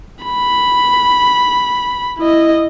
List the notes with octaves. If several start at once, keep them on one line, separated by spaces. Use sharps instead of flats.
B5
E4 D#5